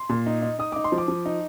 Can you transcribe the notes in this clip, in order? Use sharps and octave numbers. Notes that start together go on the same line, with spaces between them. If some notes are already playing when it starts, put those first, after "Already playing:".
Already playing: C6
A#2
D#4
D#4
D#4 D#6
D#4 D6
C6
F3
D6
F3
D#4